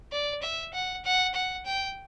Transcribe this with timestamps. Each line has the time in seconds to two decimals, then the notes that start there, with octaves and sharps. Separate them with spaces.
0.12 D5
0.42 E5
0.74 F#5
1.04 F#5
1.34 F#5
1.65 G5